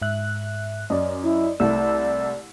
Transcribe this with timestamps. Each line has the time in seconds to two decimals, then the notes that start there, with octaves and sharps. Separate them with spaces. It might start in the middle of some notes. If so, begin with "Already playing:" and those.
0.02 G#2 E5 F#6
0.90 F#2 D5 D#5
1.23 E4
1.60 C2 A3 D5 E6